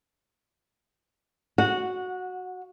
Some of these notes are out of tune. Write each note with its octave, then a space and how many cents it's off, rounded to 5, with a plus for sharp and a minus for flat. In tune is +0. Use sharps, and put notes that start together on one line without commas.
F#4 +0 F#5 -20